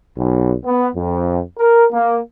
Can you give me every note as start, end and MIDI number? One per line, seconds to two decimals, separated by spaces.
0.18 0.54 35
0.65 0.88 59
0.95 1.40 41
1.58 1.87 70
1.93 2.18 58